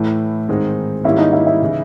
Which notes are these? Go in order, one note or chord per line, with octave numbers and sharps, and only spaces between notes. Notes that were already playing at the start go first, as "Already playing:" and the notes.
Already playing: A2 E3 A3
G#2 D#3 G#3 C4 D#4
G#2 D#3 G3 A#3 C#4 E4
D#4
E4
E4
C#3 E3